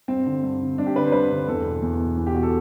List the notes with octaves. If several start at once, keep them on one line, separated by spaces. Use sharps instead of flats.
G2 C4
D3
G2
D3
G2 D4
G4
D3 B4
C5
G2 B4
D3
E2 A4
B2
E2
B2
E2
G4
B2 F#4
A4